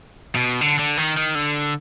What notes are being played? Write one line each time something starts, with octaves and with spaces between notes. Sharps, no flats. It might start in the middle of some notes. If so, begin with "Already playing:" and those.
B2
D3
D3
D#3
D#3
D3